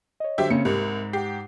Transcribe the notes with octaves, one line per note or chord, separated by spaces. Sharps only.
C#5 D#5
D3 F#3 G4 C5 E5
C#3 A#3 C4 C#4 C#7
C2 G#2 G4 A#4
G4 F#5 C7